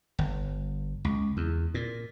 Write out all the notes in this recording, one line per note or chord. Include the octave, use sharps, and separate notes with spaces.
G1
C#2
E2
A#2